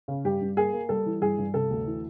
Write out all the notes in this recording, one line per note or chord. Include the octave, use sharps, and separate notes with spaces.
C#3
G2 G4
G2
A#3 G#4
A#3
G3 A4
E3
G2 G#4
G2
C3 A4
D2
E3